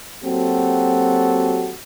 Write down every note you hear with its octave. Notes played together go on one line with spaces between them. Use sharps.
F#3 A#3 C4 F#4 G4 A4